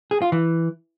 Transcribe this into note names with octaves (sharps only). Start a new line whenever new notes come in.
G#4
F4
E3